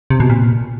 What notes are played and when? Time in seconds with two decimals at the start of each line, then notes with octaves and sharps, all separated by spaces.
0.10 C3
0.20 B2
0.30 A#2